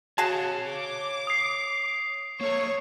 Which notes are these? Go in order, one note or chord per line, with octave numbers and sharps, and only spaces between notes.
F#4 G#4 C#5 F5 A5
D6
D#6 C7
A#3 A4 C#5 C#6